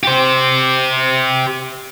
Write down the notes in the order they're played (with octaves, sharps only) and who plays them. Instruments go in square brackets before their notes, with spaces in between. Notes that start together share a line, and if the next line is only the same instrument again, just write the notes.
[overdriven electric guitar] G4 C5